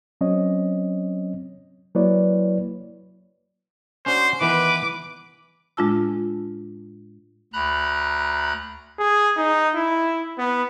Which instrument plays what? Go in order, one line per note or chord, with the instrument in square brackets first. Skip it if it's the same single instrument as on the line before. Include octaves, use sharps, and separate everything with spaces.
[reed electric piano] F#3 C4 C#4 C#5 D#5
F#3 A#3 E4 B4 C#5 D5
[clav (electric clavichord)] C#4 D4 F#4 [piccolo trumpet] C5
[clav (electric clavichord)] D#3 E3 B3 [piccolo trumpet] B4 [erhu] D6
[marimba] A2 G#3 D4 F4 A5 E6
[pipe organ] D2 A#5 B5 F#6
[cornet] G#4
D#4
E4
B3